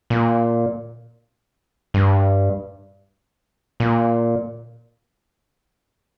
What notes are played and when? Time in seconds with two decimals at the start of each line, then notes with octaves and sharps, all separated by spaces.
0.10 A#2
1.94 G2
3.80 A#2